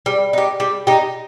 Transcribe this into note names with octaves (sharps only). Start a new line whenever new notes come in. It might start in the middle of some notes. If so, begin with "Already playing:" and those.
G3
D#4 G4
G3
D#4 G4